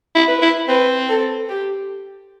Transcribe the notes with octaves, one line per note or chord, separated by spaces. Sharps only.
E4
B4
E4
C4 B4
A4
G4